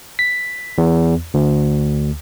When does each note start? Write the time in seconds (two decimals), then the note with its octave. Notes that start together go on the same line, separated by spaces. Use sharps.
0.19 B6
0.78 E2
1.34 D2